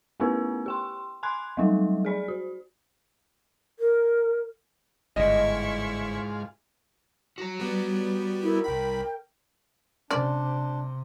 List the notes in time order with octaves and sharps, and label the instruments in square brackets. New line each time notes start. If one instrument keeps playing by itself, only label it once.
[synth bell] A3 B3 C#4 E4 G4 B4
G4 G5 C6
G#5 B5 C6 F#6 G#6
F#3 G3 A3 D#4
G#4 D5 B5
F#4
[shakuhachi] A#4
[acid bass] G1 [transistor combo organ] G#2 G#3 F4 [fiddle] E4 C#6 [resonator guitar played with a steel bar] D#5
[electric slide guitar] F#4 A#5
[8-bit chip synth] G3 B3
[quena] E4 [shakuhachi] A#4
[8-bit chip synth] C2 B5 [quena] G5
[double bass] C3 [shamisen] C#4 D5 [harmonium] D4